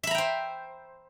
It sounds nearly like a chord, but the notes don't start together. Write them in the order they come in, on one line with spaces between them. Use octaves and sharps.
E5 B5 A#5 G5 C5